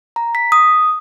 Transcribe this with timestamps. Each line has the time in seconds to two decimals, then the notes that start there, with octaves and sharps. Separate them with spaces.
0.16 A#5
0.35 B6
0.52 D#6